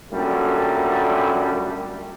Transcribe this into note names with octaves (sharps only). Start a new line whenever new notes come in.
F#2 A#2 D3 G3 A3